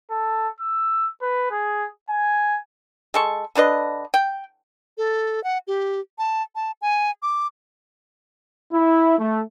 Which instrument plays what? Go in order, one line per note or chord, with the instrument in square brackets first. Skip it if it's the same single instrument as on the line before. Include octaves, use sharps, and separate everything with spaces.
[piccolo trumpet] A4
E6
B4
G#4
G#5
[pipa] G#3 A4 C#6
D3 D4 B4 D#5
G5
[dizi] A4
F#5
G4
A5
A5
G#5
D6
[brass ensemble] E4
A3